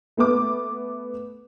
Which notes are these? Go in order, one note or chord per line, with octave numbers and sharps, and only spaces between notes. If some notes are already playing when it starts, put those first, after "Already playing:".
A3 B3 B4 D6